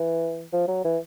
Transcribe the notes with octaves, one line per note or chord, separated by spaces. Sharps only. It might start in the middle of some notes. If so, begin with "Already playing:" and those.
Already playing: E3
F3
F#3
E3